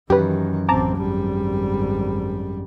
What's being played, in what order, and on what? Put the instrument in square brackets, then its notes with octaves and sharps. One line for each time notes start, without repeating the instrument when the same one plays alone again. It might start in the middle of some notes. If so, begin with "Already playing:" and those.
[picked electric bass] F#2 [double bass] D#3 E3 [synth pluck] G4 B4
[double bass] A1 C4 [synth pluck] A5 A#5 D6
[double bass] G#1 G3